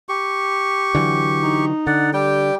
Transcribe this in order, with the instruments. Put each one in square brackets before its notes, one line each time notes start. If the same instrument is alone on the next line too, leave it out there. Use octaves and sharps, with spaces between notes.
[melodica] G4 C#6
[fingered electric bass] D3 E3 F#3
[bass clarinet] D#4
[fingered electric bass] D3 [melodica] D5 F#5
[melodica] G3 G5 [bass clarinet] G4